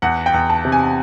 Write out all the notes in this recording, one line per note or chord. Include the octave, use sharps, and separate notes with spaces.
E2 F#5
G5
E2
A5
C3
G#5